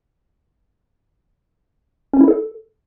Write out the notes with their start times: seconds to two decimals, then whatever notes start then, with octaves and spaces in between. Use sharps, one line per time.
2.13 C#4
2.21 E4
2.28 A4